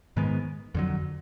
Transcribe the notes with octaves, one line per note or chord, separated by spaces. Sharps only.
G#2 D#3 G#3 B3
F2 D3 F#3